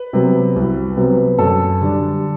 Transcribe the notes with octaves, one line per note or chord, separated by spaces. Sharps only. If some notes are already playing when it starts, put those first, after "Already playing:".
Already playing: B4
C3 F#3 B3
C2
C3 F#3 B3
F#2 A4
D3 G3 D4